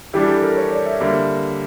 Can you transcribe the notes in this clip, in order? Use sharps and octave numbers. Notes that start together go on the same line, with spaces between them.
E3 G3 D4 G4
A4
A#4
C#5
D5
E5
D3 G3 A#3 E5